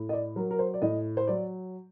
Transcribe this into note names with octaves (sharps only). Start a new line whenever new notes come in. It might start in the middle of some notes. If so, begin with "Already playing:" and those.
Already playing: A2
D#5
D5
F#3 A#4
A#4
C5
D5
A2 D#5
C5
F#3 D5